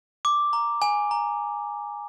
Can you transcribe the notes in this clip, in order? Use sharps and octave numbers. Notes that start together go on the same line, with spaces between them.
D6
A#5
G#5
A#5